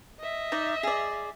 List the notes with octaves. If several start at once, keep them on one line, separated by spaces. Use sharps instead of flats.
D#5 E5
D#4 D5
G#4 D5